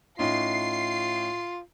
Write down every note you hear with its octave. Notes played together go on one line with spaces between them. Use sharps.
A2 C#4 D#4 F4 C7